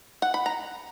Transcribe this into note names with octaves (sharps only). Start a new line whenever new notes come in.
F#5
B5
A#5